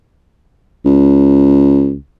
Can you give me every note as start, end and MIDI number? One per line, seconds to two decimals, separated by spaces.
0.85 1.95 37